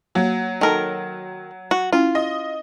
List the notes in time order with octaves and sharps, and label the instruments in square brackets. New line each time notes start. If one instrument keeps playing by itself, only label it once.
[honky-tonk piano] F#3 [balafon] A#3
[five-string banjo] D#3 A#4 [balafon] A4 G#5 A5
[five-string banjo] F#4
[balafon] C#4 E4 [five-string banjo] F4
[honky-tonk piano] D#5